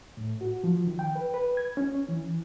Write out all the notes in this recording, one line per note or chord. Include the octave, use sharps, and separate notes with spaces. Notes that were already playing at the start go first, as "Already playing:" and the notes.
A2
F#4
F3
D#3
G5
B4
B4
G#6
C#4
E3